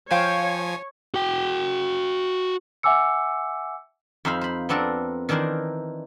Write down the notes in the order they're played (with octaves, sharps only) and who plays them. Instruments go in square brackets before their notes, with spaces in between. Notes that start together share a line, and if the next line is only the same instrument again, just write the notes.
[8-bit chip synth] F3 G#5 [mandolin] C5 F5 G5 [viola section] C#5
[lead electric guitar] F#4 G5
[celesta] E5 F#5 G#5 D6 E6 C#7
[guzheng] F2 D#4 C5 E5 F5 B5
C5 B5
B3 C4 D4 A4 A#4
D#3 E3 D4 E4 A#4 C5